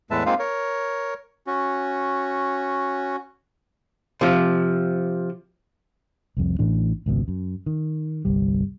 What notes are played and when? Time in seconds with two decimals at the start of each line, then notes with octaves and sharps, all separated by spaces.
0.11 E2 A2 G#3 B4 E5 A5
0.26 G#3 A#3 C4 D#4 F4 F5
0.39 A#4 C#5
1.47 C#4 F#4
4.21 C3 F3
6.37 C2 F2
6.59 A1 A2 E3 D4
7.06 G#1 C#2 B2
7.28 F#2
7.66 D#3
8.25 G1 C2 G3